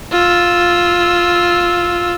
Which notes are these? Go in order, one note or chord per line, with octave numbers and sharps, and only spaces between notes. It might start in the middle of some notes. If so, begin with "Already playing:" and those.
F4 E6